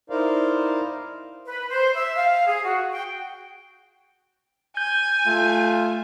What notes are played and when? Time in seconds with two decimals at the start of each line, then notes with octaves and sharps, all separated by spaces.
0.10 D#4 E4 A#4 C5 D5 F5
1.45 B4
1.69 C5
1.94 E5
2.15 F5
2.47 G#4
2.63 F#4
2.91 G5
4.77 G#5 G6
5.27 A3 F4